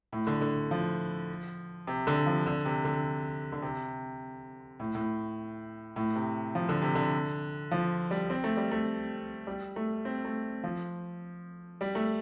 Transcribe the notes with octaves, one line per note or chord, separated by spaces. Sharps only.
A2
D3
D3
F3
C3
D3
F3
D3
C3
D3
D3
C3
A2
A2
A2
C3
F3
D3
C3
D3
F3
G3
C4
A3
G3
A3
G3
A3
C4
A3
F3
G3
A3